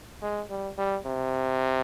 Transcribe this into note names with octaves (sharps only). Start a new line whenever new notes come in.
G#3
G3
G3
C3